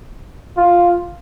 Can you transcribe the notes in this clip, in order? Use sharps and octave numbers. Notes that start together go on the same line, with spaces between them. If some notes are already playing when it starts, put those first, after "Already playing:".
F4